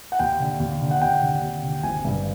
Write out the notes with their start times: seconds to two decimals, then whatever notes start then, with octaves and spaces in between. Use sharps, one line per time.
0.12 F#5
0.19 D#2 G5
0.40 D3
0.60 D#2
0.82 D3
0.91 F#5
1.02 D#2 G5
1.22 D3
1.42 D#2
1.63 D3
1.83 G#1 G#5
2.05 G2 D3